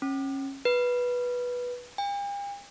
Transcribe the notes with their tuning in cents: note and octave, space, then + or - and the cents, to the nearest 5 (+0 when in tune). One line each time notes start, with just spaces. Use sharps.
C#4 -25
B4 -10
G5 +45